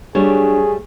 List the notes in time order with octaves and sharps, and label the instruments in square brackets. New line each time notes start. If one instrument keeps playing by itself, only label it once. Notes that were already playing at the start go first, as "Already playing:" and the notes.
[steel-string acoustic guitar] F#3 D4 G4 [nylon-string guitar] G3 A3 C#5 [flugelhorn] G#4